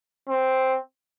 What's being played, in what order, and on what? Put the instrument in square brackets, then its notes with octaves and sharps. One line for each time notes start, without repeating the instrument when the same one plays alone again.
[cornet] C4